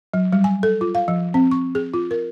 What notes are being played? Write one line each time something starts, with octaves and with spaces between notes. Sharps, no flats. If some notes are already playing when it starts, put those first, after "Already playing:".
F#3
G3
G#5
A4
F4
F5
F3
C4
C#6
G#4
F4
A#4